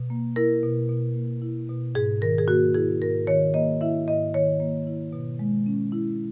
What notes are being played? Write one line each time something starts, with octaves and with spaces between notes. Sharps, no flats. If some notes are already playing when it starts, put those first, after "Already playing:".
Already playing: B2
A#3
E4 A#4
B2
B2
A#3
E4
B2
G#2 G#4
D#3 A#4
G#4
A#3 F#4
E4 G#4
G#2 A#4
D#3 C#5
A#3 D#5
E4 E5
G#2 D#5
D#3 C#5
A#3
E4
B2
G#3
C#4
E4